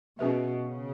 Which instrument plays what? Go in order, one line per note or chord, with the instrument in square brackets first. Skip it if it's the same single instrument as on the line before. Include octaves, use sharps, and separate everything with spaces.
[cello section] B2 [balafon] C#4 G#4 B4 E5
[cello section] C#3